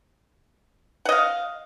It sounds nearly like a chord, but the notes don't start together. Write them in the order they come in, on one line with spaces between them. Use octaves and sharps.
F#5 D#5 F5